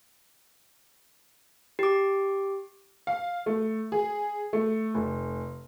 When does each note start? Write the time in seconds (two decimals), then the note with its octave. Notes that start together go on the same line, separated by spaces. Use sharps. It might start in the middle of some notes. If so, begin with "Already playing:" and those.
1.79 G4 D6
3.07 F5
3.46 A3
3.92 G#4
4.53 A3
4.94 F1